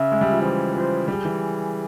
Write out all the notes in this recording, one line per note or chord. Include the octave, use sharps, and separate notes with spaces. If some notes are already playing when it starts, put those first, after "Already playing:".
Already playing: C#3 E5
G#3
G3
F3
E3 C5
F3 C5
G3 G#4
E3